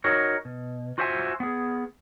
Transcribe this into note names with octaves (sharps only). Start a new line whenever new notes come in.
D#4 F#4 A#4 C#5
B2
F4 F#4 C5 E5 G5 G#5
B3 G#4